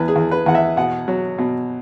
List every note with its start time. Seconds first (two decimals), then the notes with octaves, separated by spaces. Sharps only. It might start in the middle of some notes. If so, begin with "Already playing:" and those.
Already playing: E2 B4
0.08 G#4
0.16 E2
0.31 B4
0.46 E2 F#5
0.55 E5
0.77 B2 F#5
1.08 F#3
1.38 B2